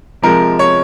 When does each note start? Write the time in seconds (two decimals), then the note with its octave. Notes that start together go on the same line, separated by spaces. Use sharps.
0.22 C3 F3 G#3 A#4
0.59 C#5